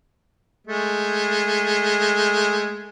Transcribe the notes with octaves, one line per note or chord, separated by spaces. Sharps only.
G#3 A3